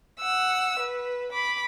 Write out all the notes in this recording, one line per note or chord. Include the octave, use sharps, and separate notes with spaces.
F#5 E6
B4
B5 D6